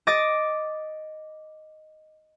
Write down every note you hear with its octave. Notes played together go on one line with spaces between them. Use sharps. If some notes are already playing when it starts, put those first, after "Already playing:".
D#5 D6 A6